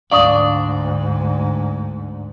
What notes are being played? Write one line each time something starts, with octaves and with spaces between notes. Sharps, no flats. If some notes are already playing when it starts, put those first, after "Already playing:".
D2 G#2 D4 D5 F5 C#6 D#6